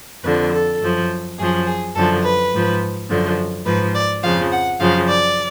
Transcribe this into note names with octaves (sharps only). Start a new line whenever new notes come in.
F2 D3 F3 B4
A4
F#2 F3
F#2 F3 G#4
G#4
F#2 D3 F3 A4
B4
G#2 F3
F#2 D3 F3
G#2 F3 B4
D5
F2 C#3 F3 F5
F#5
F#2 C#3 F3 F5
D5